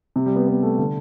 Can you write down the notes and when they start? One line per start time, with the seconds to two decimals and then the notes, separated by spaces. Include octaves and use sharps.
0.16 C3
0.26 G3
0.36 B3
0.47 B3
0.63 A3
0.79 D3